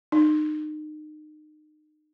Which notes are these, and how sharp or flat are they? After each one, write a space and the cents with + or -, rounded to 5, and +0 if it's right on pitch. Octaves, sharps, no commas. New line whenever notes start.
D#4 -30